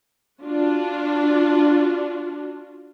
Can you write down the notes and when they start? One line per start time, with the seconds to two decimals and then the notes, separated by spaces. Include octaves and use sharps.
0.42 D4 F4 F#4